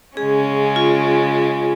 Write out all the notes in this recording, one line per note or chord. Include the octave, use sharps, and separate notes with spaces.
C#3 G#3 C#4 G#4
F4